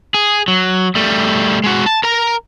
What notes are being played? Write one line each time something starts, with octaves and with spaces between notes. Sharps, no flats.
G#4
F#3
G3 A3
G#3 F#4
A5
A#4 A#5